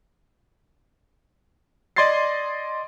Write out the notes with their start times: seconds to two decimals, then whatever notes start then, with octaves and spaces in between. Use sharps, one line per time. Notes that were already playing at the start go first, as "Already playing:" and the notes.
1.96 D5 D#5 C6 G#6 A6 C7